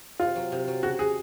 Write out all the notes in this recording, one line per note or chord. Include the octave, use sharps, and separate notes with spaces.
C3 F4
F#3
C3
F#3
C#3 F#4
G#4